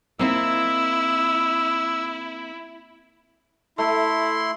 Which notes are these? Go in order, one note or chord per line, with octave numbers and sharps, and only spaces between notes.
A#3 C4 D#4 E4 E6
A3 E4 C6